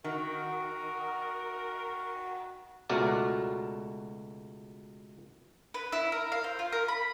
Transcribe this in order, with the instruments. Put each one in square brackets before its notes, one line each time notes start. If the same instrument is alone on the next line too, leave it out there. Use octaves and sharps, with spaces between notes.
[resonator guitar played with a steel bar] D#3 [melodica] F#4 [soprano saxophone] A#4
[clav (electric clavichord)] C#2 B2 A3 F#4 A#4 D5
[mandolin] B4
E4
A#4
F5
C5
F4
A#4
B5